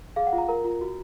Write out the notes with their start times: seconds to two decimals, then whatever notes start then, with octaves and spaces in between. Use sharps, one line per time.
0.16 G#4 F5
0.27 F#5
0.33 F4
0.38 A#5
0.49 A#4 A#5
0.65 F4
0.81 F#4